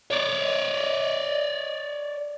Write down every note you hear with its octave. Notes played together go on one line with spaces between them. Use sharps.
C#5 D5